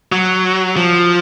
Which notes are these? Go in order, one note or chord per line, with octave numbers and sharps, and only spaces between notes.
F#3
F3